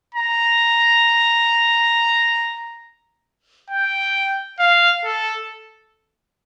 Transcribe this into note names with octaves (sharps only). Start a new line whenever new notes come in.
A#5
G5
F5
A4